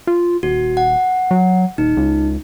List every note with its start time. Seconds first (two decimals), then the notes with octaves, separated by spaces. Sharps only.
0.07 F4
0.43 D#1 F#4
0.77 F#5
1.31 F#3
1.78 D#1 D#4
1.97 C#2